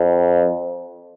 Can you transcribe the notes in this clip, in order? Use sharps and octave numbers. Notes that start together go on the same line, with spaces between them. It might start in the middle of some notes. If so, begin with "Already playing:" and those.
Already playing: F2